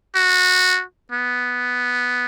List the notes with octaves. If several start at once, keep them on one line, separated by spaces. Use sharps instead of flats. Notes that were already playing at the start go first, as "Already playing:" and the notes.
F#4
B3